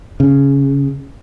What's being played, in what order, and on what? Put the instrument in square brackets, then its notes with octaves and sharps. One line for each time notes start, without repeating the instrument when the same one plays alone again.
[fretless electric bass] C#3